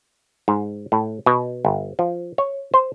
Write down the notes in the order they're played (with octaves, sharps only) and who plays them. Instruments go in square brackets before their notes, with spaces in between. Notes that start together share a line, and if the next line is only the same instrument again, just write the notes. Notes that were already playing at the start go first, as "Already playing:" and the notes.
[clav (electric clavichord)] G#2
A2
B2
G1
F3
C#5
C5